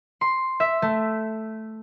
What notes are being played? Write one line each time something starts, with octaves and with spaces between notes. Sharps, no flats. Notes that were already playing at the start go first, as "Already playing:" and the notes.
C6
E5
A3